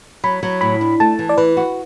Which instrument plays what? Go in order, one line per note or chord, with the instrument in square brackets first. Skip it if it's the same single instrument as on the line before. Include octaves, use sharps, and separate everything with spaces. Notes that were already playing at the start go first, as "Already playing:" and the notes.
[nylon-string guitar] F#3 [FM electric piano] B5
[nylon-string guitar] F#3
[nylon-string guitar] A2 [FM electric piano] B5
[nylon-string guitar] D4
[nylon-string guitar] A3 [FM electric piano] A5
[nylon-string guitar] E3
[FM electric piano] D5
[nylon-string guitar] E3 [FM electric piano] B4
[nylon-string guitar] F#4